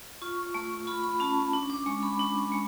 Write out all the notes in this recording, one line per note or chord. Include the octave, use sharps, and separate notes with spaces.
F4 C#6
A3
F4 B5
B5
C#4 A5
D4
D6
G#3 C#6
B5
D4
G#3